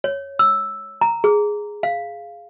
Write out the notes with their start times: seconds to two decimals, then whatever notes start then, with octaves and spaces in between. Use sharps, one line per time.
0.04 C#5
0.39 E6
1.01 A#5
1.24 G#4
1.83 F5